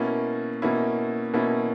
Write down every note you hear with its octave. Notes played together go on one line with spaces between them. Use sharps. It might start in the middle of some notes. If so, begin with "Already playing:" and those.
Already playing: B2 A#3 C#4 E4
B2 A#3 C#4 E4
B2 A#3 C#4 E4